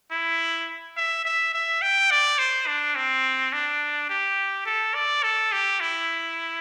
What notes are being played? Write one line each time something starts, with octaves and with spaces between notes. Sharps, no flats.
E4
E5
E5
E5
G5
D5
C5
D4
C4
D4
G4
A4
D5
A4
G4
E4